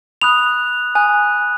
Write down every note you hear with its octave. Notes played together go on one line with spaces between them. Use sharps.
B5 D#6 F#6 F7
G#5 D#6 F#6